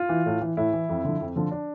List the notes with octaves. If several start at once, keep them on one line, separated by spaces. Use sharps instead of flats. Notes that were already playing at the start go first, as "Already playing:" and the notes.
Already playing: F4
E3
A2
E3
A2 E4
E3
F2
D3 F3
F2
D3 F3
D4